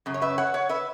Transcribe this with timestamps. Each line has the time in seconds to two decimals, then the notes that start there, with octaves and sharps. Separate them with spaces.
0.06 F#2 C#3
0.14 C#5
0.22 B4 E5
0.38 C#5 F#5
0.54 C#5 F#5
0.69 B4 E5